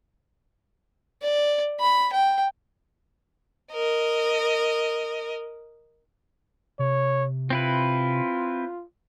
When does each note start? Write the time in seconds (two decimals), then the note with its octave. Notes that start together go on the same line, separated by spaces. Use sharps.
1.22 D5
1.80 B5
2.13 G5
3.72 A#4 D#5
6.79 C3 C#5
7.50 C4 E4 F4 B4